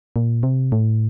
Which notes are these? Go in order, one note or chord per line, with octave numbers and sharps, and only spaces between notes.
A#2
C3
A2